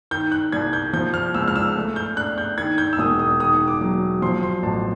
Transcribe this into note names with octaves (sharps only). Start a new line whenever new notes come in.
D#3 G6
F#6
C2 G#6
G6
F3 G6
F6
C#2 E6
F6
E6
A3
G6
D4 F#6
G6
D#3 G#6
G6
E6
E1 D#6
D#6
D#3 D#6
D6
F#3
F3 C6
C6
A1 A5